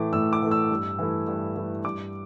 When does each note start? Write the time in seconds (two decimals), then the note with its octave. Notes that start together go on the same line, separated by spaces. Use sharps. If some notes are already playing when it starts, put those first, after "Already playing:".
Already playing: A2 E3 A3 D6
0.13 A2 E6
0.33 D6
0.42 E3 A3
0.51 E6
0.71 G2
0.99 E3 A3 E4
1.27 G2
1.56 E3 A3 E4
1.84 G2 D6